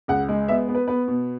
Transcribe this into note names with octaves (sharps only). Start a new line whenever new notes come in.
C#2 F#5
G#3
B3 E5
B3
B4
B3 B4
B2